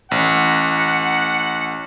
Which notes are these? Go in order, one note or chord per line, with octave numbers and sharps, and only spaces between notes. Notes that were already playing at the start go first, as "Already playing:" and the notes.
A1 F#5